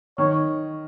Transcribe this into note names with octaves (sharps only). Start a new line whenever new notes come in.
D#3 C#5